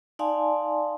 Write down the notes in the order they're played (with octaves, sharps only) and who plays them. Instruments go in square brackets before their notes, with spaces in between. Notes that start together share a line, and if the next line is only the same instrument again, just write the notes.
[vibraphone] D#4 D5 F5 G#5 A5 C6